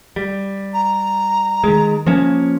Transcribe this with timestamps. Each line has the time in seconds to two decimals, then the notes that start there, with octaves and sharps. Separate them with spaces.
0.16 G3
0.74 A#5
1.64 D#3 G#3
2.06 F3 A#3 C#4